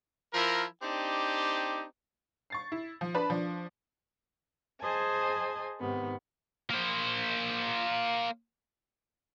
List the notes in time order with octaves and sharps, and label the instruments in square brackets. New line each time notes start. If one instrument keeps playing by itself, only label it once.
[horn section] F3 E4 A#4
C4 D4 D#4 G4
[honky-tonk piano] C#6 A6 C7
E4
F3
D4 B4 A5 B5
F3 D4
[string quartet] G#4 C5 D#5 G#5 A5
G#2 C3 D#3 B3
[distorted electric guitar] A#3 C5